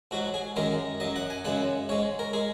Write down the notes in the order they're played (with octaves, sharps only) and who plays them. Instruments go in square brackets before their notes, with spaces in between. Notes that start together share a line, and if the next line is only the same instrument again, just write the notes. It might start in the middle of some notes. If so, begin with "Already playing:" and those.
[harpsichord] G#2 F#3 F#4
G#4
F#2 D#3 G#3 A#4
F#2 F#3 D#5
F#5
G#5
F#2 C#3 G#3 F#5
G#2 G#3 C#5
A#4
G#3 G#4